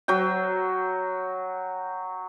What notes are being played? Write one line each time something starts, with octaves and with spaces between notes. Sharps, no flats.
F#3 G5